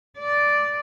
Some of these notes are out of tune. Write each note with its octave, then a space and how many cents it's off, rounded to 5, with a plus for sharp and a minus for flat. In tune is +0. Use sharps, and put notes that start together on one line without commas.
D5 -5